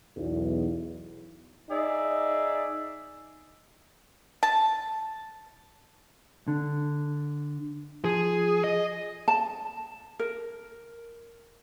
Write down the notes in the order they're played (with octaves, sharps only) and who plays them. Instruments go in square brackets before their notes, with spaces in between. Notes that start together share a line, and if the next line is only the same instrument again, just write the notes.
[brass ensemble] B1 E2
[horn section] D#4 G#4 D5 E5
[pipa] A5
[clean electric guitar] D3
[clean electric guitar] F3 [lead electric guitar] G#4
[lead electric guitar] D#5
[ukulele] A5
A#4